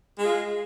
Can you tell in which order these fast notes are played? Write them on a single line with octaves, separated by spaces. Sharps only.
G#3 G#4 F4